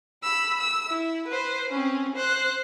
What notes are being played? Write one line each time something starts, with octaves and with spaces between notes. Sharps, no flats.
B5 E6
E6
E4
B4 C5
C4 C#4
C5 F#6